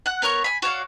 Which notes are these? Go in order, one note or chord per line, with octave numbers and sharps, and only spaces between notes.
F#5 F#6
B3 A#4 C#5 C#6
G#5 B5
F#4 C#5 D5 F5